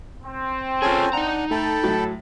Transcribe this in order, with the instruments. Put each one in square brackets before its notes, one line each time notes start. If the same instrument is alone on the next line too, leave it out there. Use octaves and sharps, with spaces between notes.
[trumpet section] C4
[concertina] C#4 A4 G#5 [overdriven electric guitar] F4 G#4
[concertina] D4 F#5 [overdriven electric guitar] D#4 A#5
[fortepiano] A3 [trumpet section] A4 [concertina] G5 A5 B5
[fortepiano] A2 F#3